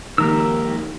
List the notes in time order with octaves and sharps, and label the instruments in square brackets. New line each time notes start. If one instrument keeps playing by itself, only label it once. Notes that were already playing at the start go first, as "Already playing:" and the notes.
[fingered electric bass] C#2 F3 A#3 [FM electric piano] D#3 [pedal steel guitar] G4 A#4 E6